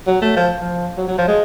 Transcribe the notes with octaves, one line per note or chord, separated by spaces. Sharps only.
F#3
A3
F3
F3
F#3
F#3
F3
G#3